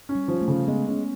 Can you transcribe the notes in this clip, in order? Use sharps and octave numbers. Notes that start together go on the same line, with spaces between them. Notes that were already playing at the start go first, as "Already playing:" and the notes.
C#4
G3
F3
A3
C#3
G#3 B3
C#4